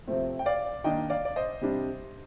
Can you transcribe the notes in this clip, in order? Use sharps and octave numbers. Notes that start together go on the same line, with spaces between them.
C3 F3 A3 C4
G5
D5 F5
D#3 A#3 D4 D#5 G5
D5 F5
D5
C5 D#5
C3 G3 D4